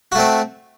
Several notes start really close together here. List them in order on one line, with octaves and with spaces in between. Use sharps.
F#4 A3 C4